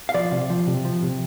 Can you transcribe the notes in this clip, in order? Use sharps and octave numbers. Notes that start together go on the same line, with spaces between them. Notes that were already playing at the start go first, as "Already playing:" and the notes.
F5
F3 D5
C3
F3
C3
F3
C3